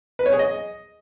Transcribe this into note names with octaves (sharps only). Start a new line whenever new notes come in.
B4
C#5
G#4
D#5